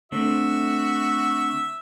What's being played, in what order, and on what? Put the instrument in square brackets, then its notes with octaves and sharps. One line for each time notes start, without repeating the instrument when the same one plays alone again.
[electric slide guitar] D3 A3 C4 [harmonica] F#4 E5